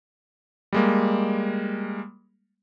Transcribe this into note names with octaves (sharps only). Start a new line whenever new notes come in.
G3 G#3 A#3